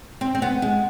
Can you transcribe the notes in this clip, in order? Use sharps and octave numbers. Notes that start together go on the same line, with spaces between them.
C4
C4
B3
G#3